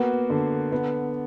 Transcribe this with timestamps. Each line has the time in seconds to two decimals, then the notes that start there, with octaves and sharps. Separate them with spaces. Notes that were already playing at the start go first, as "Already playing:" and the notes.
Already playing: A#3 B3 F#4
0.30 D3
0.72 B3